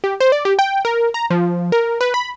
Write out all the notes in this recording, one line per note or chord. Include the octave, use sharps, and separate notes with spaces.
G4
C5
D5
G4
G5
A#4
A#5
F3
A#4
B4
B5